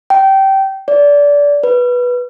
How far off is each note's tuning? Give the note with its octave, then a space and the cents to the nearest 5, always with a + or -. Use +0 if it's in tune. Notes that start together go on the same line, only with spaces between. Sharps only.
G5 -20
D5 -20
B4 -10